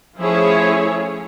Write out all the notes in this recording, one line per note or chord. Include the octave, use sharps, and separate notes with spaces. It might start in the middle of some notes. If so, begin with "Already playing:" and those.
F3 A3 C#4 E4 G#4 C#5